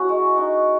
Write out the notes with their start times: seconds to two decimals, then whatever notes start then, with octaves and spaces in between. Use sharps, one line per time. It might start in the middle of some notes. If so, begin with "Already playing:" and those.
Already playing: C#4 E4 F#4 F#5
0.09 G#3
0.37 D#4